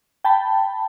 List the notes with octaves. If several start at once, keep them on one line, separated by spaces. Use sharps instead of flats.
G5 A5 B5